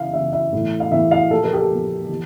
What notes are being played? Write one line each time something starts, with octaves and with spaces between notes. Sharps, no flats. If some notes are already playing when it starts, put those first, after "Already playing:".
Already playing: C#3 E3 E5 F5
C#3 E3 E5
E5
A2 E3
F5
A2 E3 E5
F5
A#2 F3 A4
A#4
G4
A4
A#2 F3
E3